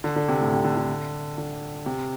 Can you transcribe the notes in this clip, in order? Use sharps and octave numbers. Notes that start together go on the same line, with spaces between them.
D3
D3
C3
A2
C3
D3
D3
D3
C3